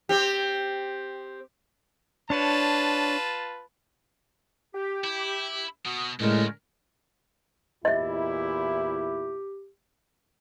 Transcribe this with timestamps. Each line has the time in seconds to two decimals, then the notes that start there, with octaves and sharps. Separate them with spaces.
0.09 C4 G4
2.30 D4 F4 B4 C#5 A5
4.74 G4
5.04 E4
5.86 B2 F#4 D#6
6.21 F#2 A2 D3 G#3 A3 C#4 A#4
7.85 E2 A#2 E4 G4 D#5 E5